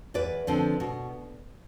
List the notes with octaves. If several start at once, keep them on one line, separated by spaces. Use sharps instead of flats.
E2 B4 D5
D3 F3 C4
B2